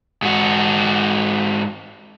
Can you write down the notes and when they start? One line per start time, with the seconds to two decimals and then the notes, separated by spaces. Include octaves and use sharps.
0.22 G#2 F#4